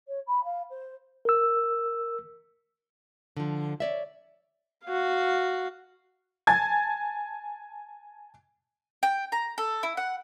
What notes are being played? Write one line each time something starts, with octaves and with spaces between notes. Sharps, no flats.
C#5
B5
F5
C5
A#4 E6
D3 F3
C#5 D5 E5
F#4 F5
G#5 A5 G#6 A6
G5
A#5
A4
E4
F#5